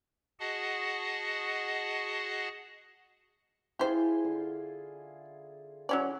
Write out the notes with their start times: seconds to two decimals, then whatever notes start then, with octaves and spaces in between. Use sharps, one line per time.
0.39 F#4 G#4 D#5 F#5 A5
3.79 E4 F4 G4 G#4 C5
4.25 D3
5.89 F#3 C#4 F#4 D5